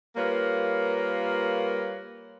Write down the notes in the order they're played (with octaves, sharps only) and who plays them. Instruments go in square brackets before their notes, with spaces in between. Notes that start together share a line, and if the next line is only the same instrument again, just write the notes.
[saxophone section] G3 A#3 F4 A#4 B4 C#5